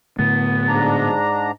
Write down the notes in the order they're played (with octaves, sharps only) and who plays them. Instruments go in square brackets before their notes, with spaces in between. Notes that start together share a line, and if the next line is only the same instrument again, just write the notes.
[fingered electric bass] A2 D3 A3 [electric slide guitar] B3
[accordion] G#2 D4 A#5